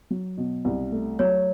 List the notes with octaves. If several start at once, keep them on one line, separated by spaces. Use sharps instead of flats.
F#3
B2
C2
A3
F#3 C#5